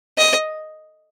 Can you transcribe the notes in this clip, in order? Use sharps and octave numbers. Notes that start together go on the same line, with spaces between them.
D#5